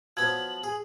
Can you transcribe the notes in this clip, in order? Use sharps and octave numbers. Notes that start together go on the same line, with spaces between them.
F3 F#3 B3 G#6 F#7
G#4